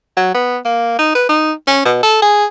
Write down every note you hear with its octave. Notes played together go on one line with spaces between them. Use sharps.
F#3
B3
A#3
D#4
B4
D#4
C#4
B2
A4
G#4